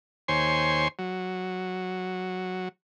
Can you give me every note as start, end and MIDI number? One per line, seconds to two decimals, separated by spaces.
0.28 0.88 39
0.28 0.88 72
0.28 0.88 73
0.28 0.88 80
0.28 0.88 84
0.99 2.69 54